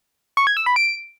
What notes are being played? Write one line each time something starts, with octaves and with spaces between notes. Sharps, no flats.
C#6
G#6
E6
B5
D7